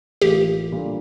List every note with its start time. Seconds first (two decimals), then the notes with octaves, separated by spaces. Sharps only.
0.21 A1 A2 E3 A#3 F4 G4
0.72 A#2 G3 D4 F4 A4